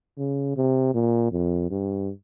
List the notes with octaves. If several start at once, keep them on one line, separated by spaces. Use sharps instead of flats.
C#3
C3
A#2
F2
G2